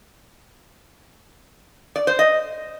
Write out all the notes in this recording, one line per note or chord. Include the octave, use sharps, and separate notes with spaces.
D5
C5
D#5